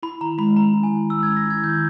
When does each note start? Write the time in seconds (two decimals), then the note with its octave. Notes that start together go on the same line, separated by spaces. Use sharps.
0.03 E4 B5
0.21 D#3 A#5
0.38 G#3 B5
0.57 C#4 A#5
0.74 E4
0.83 G#5
0.93 D#3
1.10 G#3 E6
1.23 G#6
1.28 C#4
1.36 A#6
1.46 E4 G#6
1.64 D#3 G6